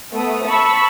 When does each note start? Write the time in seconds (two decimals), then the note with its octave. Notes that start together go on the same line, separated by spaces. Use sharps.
0.13 A3 B3 D#6
0.45 A5 B5 C#6 E6